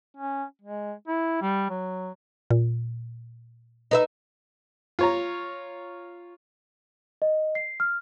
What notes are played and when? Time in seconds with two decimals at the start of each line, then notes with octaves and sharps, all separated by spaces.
0.17 C#4
0.62 G#3
1.07 E4
1.42 G3
1.70 F#3
2.50 A#2
3.91 D#4 B4 E5
4.99 F4 C#5 A#5
7.22 D#5
7.55 C7
7.80 F6